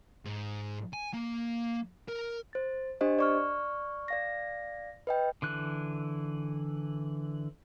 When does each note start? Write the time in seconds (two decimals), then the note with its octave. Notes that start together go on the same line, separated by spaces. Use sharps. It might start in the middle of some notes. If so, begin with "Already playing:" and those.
0.25 G#2
0.94 G#5
1.14 A#3
2.09 A#4
2.53 C5 A6
3.01 D4 G4 C5 D#5
3.19 D5 C#6 F6
4.08 D5 F5 A#6
5.07 B4 D#5 G5
5.42 D3 E3 F#6